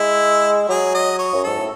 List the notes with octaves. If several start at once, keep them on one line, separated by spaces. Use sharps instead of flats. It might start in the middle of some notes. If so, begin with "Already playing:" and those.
Already playing: G#3 E4
F#3 G#4
D#5
C#5
F#2
G#2 A4
A2